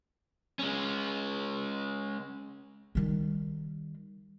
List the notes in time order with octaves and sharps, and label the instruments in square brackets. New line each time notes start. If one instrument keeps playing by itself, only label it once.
[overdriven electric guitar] G#3 C#4
[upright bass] D#3 G3